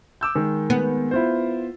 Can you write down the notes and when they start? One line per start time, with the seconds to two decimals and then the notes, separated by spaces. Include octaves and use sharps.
0.21 D6 E6 G6
0.35 D#3 G#3
0.70 B3
1.11 E4 F4 C5